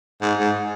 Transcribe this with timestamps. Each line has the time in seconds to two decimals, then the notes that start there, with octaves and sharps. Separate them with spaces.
0.22 G#2
0.39 G#2